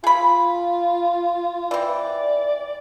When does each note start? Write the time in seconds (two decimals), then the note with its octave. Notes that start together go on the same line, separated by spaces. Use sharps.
0.04 F4 G#4 B5
1.71 E3 C4 D5